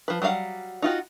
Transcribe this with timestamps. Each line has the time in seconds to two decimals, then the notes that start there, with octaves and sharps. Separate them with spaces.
0.08 F3 B4
0.22 F#3 G3 F4 F5 F#5
0.82 D#4 F4 F#4